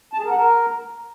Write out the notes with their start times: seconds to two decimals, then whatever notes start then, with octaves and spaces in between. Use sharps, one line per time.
0.13 A5
0.19 G#4
0.25 A#4
0.30 F#5
0.36 A#4